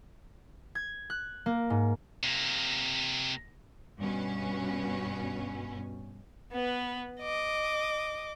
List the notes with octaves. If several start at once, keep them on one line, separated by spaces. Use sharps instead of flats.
G#6
F#6
A#3
G#2
C3 A#3
G2 B2 C#4
B3 B4
D#5 D6